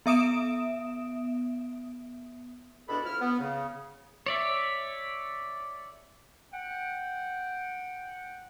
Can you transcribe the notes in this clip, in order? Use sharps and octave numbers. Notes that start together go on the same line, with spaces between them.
B3 E5 D#6 D7 E7
E2 B2 D4 F#4 A4 B5
F2 E4 F6
B3
C#3
C#5 D5 E5
F#5 G5